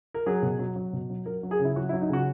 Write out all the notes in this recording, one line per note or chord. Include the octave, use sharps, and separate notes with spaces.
A#4
F#3 G#4
B2
F#3
F#3
B2
F#3
F#3 A#4
F#3
G#4
C#3
E4
F#3 F#4
E4
F#3
D#4
C#3 F#4